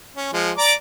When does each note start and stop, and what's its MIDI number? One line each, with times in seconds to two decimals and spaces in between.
0.17 0.29 61
0.33 0.51 53
0.33 0.51 56
0.58 0.73 74
0.58 0.73 82
0.58 0.73 86